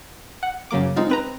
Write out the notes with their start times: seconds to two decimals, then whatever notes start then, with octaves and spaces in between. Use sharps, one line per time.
0.43 F#5
0.71 F#2 C#3 F#3 A#3 D6
0.96 G#3 C4 D#4 F4
1.10 C4 B4 A#5